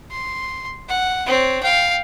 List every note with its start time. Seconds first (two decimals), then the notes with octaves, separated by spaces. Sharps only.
0.11 C6
0.89 F#5
1.26 C4 C#5
1.63 F5 G5